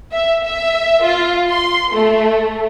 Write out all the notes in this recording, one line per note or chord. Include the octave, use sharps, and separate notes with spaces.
E5
E5
F4
C6
A3